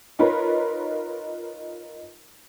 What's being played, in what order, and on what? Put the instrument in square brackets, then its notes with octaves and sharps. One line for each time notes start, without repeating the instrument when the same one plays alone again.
[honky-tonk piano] D#4 F4 A#4 B4 C#5